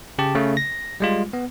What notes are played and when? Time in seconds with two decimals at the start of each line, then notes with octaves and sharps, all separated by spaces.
0.18 C#3 G4 A5
0.35 C#3 A3
0.57 A#6
1.00 G3 G#3 F4
1.33 B3